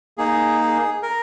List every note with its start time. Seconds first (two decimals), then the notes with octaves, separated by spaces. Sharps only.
0.18 A#3 D#4 G#4
0.60 G#4
1.03 A#4